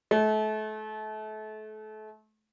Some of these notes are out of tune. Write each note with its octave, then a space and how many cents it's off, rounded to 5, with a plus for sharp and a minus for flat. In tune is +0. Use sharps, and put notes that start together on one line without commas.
A3 -35